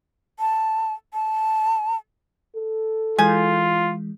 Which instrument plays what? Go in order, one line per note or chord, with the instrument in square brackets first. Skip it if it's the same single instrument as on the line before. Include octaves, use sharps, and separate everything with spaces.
[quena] A5
A5
[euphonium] A4
[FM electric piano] E3 G#3 [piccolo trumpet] F4 [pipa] G#5